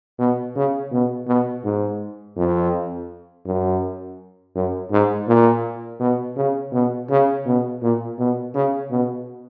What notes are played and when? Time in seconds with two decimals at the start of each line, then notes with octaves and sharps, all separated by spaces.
0.19 B2
0.55 C#3
0.92 B2
1.27 B2
1.64 G#2
2.37 F2
3.46 F#2
4.55 F#2
4.91 G#2
5.28 A#2
6.00 B2
6.36 C#3
6.73 B2
7.10 C#3
7.46 B2
7.82 A#2
8.19 B2
8.54 C#3
8.91 B2